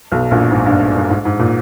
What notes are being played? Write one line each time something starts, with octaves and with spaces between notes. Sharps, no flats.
B1 B2
A#1 A#2
G#2
G2
G2
G#2
G#2
A#2